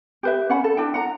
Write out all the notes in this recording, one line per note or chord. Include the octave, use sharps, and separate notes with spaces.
G4 B4 E5
C#4 F#5 B5
A4
D4 E4 G5
F#5 A#5